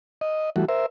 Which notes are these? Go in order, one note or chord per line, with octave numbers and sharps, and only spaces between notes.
D#5
E3 G3 A3 F#4
A#4 C5 E5